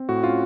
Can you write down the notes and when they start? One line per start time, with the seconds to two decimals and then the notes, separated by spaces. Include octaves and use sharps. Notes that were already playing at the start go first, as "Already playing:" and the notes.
Already playing: C4
0.09 A2 F#4
0.23 C#4 F4